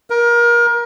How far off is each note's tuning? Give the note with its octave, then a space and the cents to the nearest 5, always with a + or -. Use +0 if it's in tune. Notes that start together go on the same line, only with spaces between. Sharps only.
A#4 +25